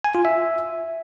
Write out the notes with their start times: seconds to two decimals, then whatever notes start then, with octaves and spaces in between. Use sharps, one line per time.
0.04 G#5
0.15 F4
0.25 E5